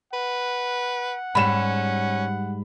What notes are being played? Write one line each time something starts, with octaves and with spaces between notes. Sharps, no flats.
B4 F#5
G#2 G3 C#4 B5 E7